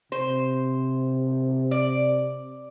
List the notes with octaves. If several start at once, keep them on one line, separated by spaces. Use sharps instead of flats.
C3 C5
D5